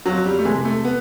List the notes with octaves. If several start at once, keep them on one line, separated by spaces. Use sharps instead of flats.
F2 F#3
G3
A3
C3 E3 G#3
A3
B3